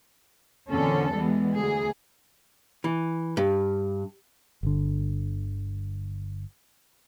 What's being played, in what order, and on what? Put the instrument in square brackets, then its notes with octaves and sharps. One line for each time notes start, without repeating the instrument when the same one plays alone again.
[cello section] E2 A#2 D3 C4 C#4 A4
E3 G3 G#3 B3
D2 G#4
[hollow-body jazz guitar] E3
G2
[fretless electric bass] G1 D3